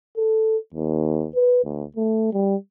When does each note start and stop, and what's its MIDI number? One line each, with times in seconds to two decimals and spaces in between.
0.17 0.57 69
0.74 1.27 39
1.35 1.63 71
1.64 1.84 38
1.96 2.28 57
2.33 2.56 55